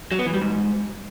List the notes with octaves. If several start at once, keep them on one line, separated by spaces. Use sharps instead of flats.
F#3
B3
E3
G3
G#2